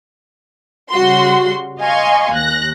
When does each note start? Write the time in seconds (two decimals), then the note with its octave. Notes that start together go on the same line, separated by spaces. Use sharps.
0.91 C#3 G3 F#4 C6
1.80 D#5 F5 G#5 C6 C#6
2.32 D#2 F#6 A#6